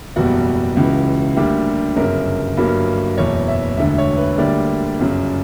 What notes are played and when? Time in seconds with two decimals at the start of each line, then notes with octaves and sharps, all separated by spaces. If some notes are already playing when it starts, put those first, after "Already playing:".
0.16 F#1 E2 B2 G3 F#4
0.77 C#2 C#3 E3
1.37 D2 D3 G3 A#3 G4
1.96 G1 F#2 C#3 A#4
2.57 G1 G2 F#3 A#3
3.17 F#1 E2 B2 C#5
3.48 E5
3.77 E1 D2 D3 E5
3.98 C#5
4.17 B4
4.38 D2 D3 G3 A#3 D5
4.99 G1 F#2 C#3